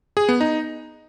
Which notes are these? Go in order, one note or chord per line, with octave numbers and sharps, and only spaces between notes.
G#4
B3
D#4